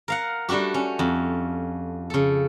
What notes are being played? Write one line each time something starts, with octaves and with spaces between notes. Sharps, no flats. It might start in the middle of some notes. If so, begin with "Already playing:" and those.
A#4 F5 F#5
G3 A3 D4 F#4 G4
C#4
F2
C#3 A4